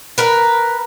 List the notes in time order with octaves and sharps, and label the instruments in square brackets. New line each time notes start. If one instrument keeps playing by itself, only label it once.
[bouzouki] A#4 B4